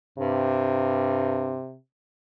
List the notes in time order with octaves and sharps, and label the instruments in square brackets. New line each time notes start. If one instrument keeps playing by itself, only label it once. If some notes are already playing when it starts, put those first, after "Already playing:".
[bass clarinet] G2 [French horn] C3